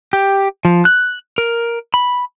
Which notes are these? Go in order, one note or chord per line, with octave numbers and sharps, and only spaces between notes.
G4
F3
F#6
A#4
B5